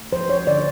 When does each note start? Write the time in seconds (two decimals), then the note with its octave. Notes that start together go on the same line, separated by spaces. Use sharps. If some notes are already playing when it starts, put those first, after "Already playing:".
Already playing: A3
0.12 F3 C5
0.29 C#5
0.47 D3 D5